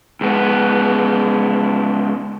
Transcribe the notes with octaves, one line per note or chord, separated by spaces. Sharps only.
C#2 B3